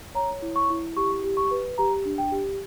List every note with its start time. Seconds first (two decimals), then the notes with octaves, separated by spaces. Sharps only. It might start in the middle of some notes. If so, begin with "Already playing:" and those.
0.15 C#5 A#5
0.42 E4
0.56 C#6
0.70 E4
0.97 G4 C#6
1.24 G4
1.37 C#6
1.51 B4
1.78 G4 A#5
2.05 D4
2.18 G5
2.32 G4